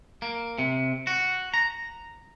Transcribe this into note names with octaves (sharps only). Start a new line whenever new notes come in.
A#3
C3
F#4
A#5